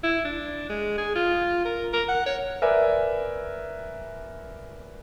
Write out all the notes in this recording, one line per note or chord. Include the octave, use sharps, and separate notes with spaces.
E4
D4
G#3
G#4
F4
A#4
A#4
F#5
C#5
A#4 B4 D5 E5 G#5